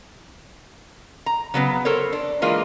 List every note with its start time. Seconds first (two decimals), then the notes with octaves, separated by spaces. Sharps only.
1.26 A#5
1.54 C#3 F#3 B3
1.85 A4 A#4 C5 C#5
2.13 D4
2.42 E3 G#3 A#3 F4